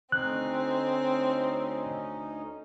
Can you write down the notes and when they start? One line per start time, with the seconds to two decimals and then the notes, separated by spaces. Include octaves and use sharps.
0.12 D2 C4 C#4 D#4 F#6